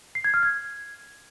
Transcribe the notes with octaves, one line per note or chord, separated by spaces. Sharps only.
C7
G#6
F6
G#6